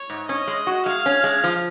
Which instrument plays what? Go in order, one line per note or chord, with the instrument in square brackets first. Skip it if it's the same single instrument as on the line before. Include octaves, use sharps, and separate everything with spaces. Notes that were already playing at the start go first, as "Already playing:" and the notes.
Already playing: [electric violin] C#5
[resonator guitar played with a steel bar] G#2
[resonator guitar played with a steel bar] C#4 [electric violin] D#5
[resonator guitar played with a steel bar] G#3
F#4
[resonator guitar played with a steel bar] G#3 [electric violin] F5
[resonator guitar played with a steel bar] C#4
G#3
F3